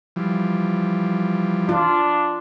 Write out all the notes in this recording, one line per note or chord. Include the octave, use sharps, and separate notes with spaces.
E3 F3 G3
D4 F4